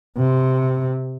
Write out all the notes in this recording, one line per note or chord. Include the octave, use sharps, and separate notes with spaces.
C3